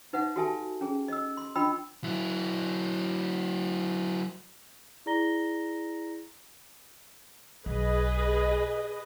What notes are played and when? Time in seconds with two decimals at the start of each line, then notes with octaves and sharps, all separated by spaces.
0.13 D#4 B4 E5 F#5
0.36 F#4 G4 A4 E5 G#5 A5
0.81 C#4 G#4
1.08 D#5 E6
1.37 C6
1.56 D4 F4 D#5 G5 B5 E6
2.04 F#3 E4
5.06 E4 G#4 D5 A#5 A#6 G7
7.66 B1 G#4 B4 D#5